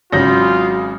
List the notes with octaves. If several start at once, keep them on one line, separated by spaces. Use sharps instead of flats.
G#1 C#3 F#3 F4 G6 A#6